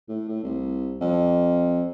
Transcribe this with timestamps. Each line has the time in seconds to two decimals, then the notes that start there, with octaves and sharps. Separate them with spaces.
0.09 A2
0.28 A2
0.44 C2
1.01 F2